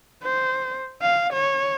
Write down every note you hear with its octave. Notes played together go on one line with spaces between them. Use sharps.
C5
F5
C#5